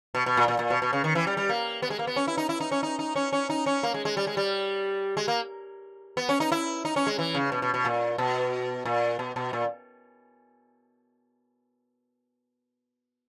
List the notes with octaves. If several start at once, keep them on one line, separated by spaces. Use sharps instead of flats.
B2
B2
A#2
A#2
A#2
B2
B2
C#3
D#3
E3
G3
G3
A#3
B3
G#3
A#3
B3
C#4
E4
D#4
E4
D#4
C#4
D#4
D#4
C#4
C#4
D#4
C#4
A#3
G#3
G#3
G3
G#3
G3
G#3
A#3
B3
C#4
D#4
E4
D#4
C#4
G#3
E3
C#3
B2
B2
B2
A#2
B2
A#2
B2
B2
A#2